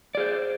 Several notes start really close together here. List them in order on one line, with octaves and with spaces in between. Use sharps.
D5 G#4 C5